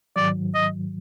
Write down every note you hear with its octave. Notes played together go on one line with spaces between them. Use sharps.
G#2 D#3 F#3 D5
D#5